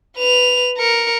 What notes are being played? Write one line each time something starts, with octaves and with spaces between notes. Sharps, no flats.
B4 F7
A#4 C#7